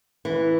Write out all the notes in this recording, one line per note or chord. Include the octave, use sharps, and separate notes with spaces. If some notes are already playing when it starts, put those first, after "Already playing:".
E3